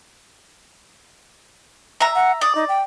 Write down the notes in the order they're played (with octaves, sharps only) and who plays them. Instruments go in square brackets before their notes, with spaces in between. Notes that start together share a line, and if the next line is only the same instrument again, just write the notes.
[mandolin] E5 A#5
[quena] F#5
[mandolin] D5 [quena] D#6
[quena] D#4
G5